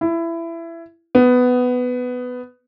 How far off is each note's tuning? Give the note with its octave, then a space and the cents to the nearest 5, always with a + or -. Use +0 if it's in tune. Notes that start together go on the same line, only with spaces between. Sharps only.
E4 +20
B3 +10